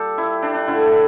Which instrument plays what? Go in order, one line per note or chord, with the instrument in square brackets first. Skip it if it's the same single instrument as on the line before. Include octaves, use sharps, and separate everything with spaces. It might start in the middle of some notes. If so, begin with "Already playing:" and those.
Already playing: [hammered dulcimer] A#2 G3 A#3 G4 A4
E4
D4
D4
D3 A3 E4